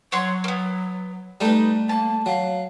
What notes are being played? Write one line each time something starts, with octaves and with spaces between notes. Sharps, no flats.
F#3 C#5 F#5 C6
A#3 B3
G3 A3 D#4 B4
A#3 A5
F#3 F5